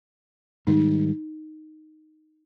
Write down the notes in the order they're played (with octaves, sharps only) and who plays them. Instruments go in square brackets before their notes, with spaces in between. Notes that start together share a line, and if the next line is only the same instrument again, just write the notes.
[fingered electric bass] G#2 D#3 G3 [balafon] D#4